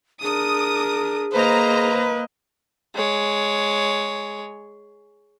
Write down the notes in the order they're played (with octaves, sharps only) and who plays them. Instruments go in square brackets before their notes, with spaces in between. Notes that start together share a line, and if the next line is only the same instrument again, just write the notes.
[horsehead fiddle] D4 A#4 [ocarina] G#4 [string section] D#6
[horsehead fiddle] A#3 D#5 [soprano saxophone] B4 [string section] C5 A#5
[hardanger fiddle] G#3 C#5